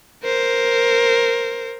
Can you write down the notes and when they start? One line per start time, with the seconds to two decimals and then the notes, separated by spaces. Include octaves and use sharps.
0.24 A#4 C5